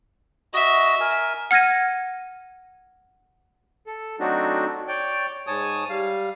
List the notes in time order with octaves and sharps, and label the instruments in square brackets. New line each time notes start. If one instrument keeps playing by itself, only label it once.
[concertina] F#4 D#5 [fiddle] E5
[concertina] A#4 G#5
[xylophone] F#5 F6 G#6 A#6 D#7
[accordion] A4
F#3 A3 C4 D4 D#4 F#4
C#5 D5 G5
G#2 C#5 G#5 A5 D#6
G3 F5